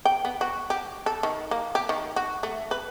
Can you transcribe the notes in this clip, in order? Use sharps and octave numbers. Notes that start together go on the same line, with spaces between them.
G5
B3
F#4
G4
A4
D#3
A#3
G4
D#3
F#4
A3
B4